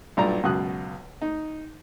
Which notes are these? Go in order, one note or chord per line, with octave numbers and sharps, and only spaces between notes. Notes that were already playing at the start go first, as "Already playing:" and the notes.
B1 G2 A#2 D5 A#5
C#2 F#2 B2 D#6 F#6
D#4